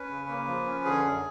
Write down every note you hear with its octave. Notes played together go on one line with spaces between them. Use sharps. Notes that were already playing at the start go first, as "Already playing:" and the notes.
Already playing: C#4 B4
C#3
A#3
F3
C#4
D3 G#4
F#2